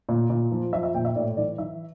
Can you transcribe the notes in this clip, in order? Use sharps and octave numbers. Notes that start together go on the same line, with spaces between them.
A#2
A#2
F3
F3 E5
E5
A#2 G5
E5
A2 D5
E3 D5
E3 E5